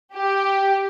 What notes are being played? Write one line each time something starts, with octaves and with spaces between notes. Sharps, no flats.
G4